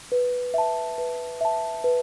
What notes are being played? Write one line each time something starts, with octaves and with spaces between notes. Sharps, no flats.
B4
E5 A5
B4
E5 A5
B4